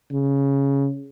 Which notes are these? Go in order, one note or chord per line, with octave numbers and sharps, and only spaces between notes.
C#3